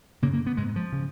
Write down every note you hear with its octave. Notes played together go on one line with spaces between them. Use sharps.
F#2 C#3 A#3
A#3
B3
G#2 G#3
F3
C#3